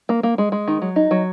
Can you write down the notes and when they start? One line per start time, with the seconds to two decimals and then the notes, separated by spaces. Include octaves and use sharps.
0.09 A#3
0.23 A#3
0.38 G#3
0.52 G#3
0.68 D#3
0.82 F#3
0.96 D#4
1.11 F#3